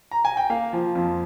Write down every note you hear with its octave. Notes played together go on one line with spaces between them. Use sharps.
A#5
G#5
G5
A#3 F5
F3
F2